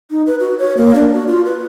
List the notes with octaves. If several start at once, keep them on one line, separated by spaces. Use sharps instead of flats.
D#4
B4
F#4
C#5
A#3
D4
F#4
F4
B4